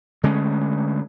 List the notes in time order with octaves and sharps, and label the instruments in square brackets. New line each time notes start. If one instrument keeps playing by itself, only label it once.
[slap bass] D3 G#3 A3 C#4